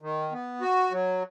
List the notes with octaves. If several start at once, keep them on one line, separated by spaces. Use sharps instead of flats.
D#3
B3
F#4
F#3